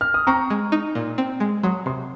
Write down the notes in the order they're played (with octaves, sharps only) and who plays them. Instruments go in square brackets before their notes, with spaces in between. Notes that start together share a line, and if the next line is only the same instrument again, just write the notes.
[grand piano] F6
D#6
[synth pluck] C4 [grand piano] A#5 C#6
[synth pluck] G#3
D#4
A#2
C4
G#3
[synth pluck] F#3 [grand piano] C6 D#6
[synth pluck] C3 [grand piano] C6 D#6